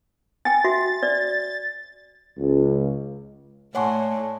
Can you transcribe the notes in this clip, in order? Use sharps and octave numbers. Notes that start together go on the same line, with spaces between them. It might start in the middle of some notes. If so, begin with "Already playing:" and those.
G5 G#5 A6
F#4 E5
D5
C#2
A2 C#5 D5 F#5 G#5 A5 C6 C#6